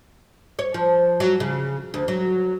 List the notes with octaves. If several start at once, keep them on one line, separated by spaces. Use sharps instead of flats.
C#5
F3
F#3
C#3
D2
F#3